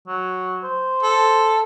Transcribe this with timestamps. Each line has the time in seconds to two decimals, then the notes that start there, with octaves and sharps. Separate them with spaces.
0.08 F#3
0.64 C5
1.03 A4